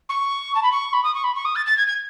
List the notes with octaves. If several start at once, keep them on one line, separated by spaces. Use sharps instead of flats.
C#6
A5
B5
C#6
B5
D#6
C#6
B5
C#6
D#6
A6
A6
G#6
G#6